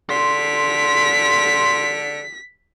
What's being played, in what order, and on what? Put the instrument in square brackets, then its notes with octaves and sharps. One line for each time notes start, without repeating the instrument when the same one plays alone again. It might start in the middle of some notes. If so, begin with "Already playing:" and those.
[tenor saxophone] D3 [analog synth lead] C6 [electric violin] B6